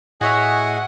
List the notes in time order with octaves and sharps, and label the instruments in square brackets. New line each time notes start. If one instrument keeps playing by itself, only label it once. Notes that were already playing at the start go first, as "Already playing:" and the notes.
[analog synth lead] A2 [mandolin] F#4 C#5 E5 [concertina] G#4 D#5 G#5 [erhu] F#5